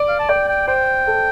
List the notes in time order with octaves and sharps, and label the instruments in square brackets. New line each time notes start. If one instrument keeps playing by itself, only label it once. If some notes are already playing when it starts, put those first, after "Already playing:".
Already playing: [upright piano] D5
[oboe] F5
A5
[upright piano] D5 [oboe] G5
[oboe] G5
[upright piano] C5 [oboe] G5
[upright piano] A4